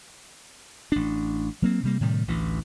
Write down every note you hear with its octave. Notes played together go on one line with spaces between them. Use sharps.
A1 D4
F#3 A#3 C4
C3 G3 A#3
A2 C3 D#3 G3
A1 D2 E3